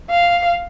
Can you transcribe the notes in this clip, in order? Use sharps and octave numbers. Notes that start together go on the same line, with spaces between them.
F5